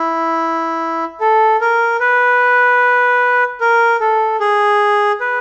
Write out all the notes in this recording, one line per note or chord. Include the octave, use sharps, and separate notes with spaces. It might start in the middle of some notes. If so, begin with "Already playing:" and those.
Already playing: E4
A4
A#4
B4
A#4
A4
G#4
B4